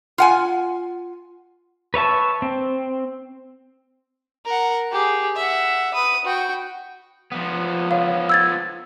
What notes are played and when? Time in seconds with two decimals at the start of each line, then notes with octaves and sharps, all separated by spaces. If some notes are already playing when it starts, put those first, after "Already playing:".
0.18 F4 F#5 G#5
1.94 B4 C#5 E5 A5
2.42 C4
4.46 A#4 F#5
4.92 G4 G#4
5.36 E5 F#5
5.94 B4 D#6
6.25 F#4 G5
7.32 F3 B3
7.91 C#5 F5
8.29 E6 G#6 A6